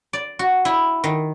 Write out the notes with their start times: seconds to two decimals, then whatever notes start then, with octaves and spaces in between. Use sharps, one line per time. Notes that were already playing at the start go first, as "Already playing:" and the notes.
0.13 D5
0.39 F#4
0.65 E4
1.04 D#3